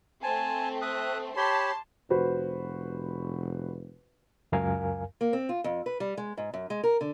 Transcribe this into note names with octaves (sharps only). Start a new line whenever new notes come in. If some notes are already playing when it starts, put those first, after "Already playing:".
A3 C4 G#5 A5
E5 D#6 F#6
G4 C#5 A5 B5 C6
F1 F#4 B4 C5
C#2 F#2 A#4 F5 G#5
A#3
C4
F4
F2
B4
G3
G#3
G#2
F#2
G#3
A#4
D3